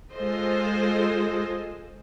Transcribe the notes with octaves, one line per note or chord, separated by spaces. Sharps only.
G#3 F4 A4 C5 D#5